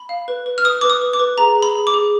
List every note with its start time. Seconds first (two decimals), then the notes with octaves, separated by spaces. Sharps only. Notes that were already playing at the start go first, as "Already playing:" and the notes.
Already playing: B5
0.09 F5
0.28 B4
0.46 B4
0.58 F6
0.64 B4 D#6
0.81 B4 D6
0.90 D#6
1.01 B4
1.13 D6
1.19 B4
1.38 G#4 A#5
1.56 G#4
1.62 B5
1.75 G#4
1.87 D6
1.94 G#4